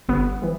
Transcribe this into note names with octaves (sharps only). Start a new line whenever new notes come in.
G1 B3
E3 G3